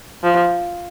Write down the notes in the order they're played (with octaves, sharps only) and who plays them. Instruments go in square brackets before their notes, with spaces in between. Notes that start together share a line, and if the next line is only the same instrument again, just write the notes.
[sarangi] F3